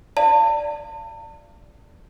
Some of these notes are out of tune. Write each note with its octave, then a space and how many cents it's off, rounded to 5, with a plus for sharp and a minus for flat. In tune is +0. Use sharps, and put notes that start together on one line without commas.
D5 +0 F5 -35 A5 +35